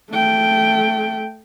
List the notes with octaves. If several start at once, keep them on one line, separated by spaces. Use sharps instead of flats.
A3 G5